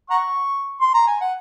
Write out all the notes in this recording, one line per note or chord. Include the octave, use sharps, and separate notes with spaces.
F#5 A#5 C#6
C6
A#5
G#5
F#5